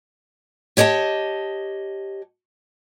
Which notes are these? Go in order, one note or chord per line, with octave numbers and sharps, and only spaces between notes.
G4 C#5 D#5 F#5 A5